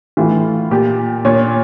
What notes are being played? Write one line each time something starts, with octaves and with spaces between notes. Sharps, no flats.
A2 E3 F4
A#2 G4
A#2 C#5